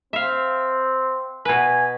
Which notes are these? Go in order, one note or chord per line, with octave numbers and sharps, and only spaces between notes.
C4 E5 F5
B2 B4 G#5